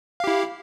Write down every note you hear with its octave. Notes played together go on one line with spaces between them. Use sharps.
E4 G4 F5